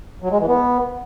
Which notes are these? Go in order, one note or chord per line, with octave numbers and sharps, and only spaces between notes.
F#3
G#3
E3
B3